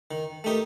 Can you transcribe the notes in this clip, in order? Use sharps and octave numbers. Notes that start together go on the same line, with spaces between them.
D#3
A3 D#4 G4 A#4